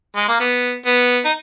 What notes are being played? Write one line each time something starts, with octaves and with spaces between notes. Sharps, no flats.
G#3
A#3
B3
B3
D#4